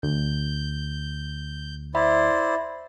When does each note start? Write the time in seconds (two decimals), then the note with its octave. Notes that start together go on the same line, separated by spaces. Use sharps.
0.03 D2 G6
1.95 E4 C5 D5 E5 B5